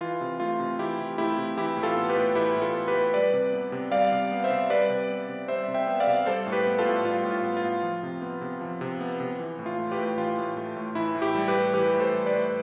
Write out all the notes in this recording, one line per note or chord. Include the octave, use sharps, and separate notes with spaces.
E3 F4
C3
A3 F4
C3
E3 E4 G4
C3
A3 E4 G4
C3
E3 E4 G4
A2
F4 A4
B3
G4 B4
A2
E3 E4 G4
A2
F4 A4
B3
G4 B4
A2
G3 B4 D5
C3
B3
C3
G3 D5 F5
C3
B3
C5 E5
C3
G3 B4 D5
C3
B3
C3
G3 C5 E5
C3
E5 G5
B3
D5 F5
C3
G3 A4 C5
A2
G4 B4
B3
F4 A4
A2
G3 F4
A2
F4
B3
F4
A2
F3
C3
B3
C3
F3
C3
B3
C3
E3
A2
F4
A3
G4 B4
A2
E3 F4
A2
A3
A2
E3 E4
A2
E4 G4
G3
G4 B4
A2
E3 G4 B4
A2
A4 C5
G3
B4 D5
A2